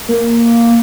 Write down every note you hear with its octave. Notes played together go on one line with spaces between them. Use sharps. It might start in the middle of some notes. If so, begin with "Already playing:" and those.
A#3